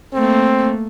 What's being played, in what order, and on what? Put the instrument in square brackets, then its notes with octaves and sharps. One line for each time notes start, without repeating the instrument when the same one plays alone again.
[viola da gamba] A3 A#3 [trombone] C4